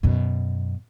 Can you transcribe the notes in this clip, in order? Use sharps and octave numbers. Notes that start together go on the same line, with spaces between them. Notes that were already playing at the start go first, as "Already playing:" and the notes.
F#2 B2